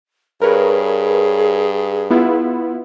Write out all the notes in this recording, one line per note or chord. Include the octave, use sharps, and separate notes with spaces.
G2 G#4 A#4 B4 C#5
B3 E4 F4